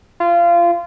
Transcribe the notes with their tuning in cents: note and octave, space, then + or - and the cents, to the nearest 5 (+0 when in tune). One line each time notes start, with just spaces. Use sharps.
F4 -25